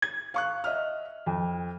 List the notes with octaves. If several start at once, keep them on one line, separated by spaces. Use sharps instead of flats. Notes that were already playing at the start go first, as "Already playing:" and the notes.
G#6
F5 C#6 F#6
D#5 E5 F6
F2